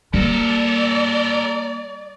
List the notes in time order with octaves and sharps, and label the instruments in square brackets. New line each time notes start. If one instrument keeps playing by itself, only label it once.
[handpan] G3 [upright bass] A#3 [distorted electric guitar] A4 A#4 [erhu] D5